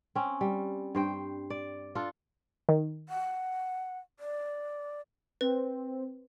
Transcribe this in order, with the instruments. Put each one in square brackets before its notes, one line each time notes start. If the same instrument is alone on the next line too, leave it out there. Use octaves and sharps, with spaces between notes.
[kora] C4 C#4
G3
G2 C5 G5
D5
D4 F4 A4
[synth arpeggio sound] D#3
[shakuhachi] F#5
D5
[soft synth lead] C4 [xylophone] B4